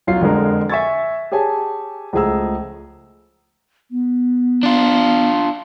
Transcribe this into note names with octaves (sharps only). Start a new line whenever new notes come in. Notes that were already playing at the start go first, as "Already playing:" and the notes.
B1 F#2 F4 C7
F2 D3 G#3 A#4
E5 G#5 C#6 E6 G#6 A6
G4 G#4 C#5 G#5 A5
C#2 F3 A3 G#4 A#5 E6
B3
D4 F4